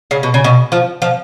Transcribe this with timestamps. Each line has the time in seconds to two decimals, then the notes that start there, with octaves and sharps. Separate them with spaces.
0.11 C#3
0.23 B2
0.34 C#3
0.44 B2
0.72 F3
1.02 F3